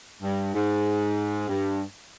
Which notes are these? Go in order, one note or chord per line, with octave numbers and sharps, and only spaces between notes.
G2
G#2
G2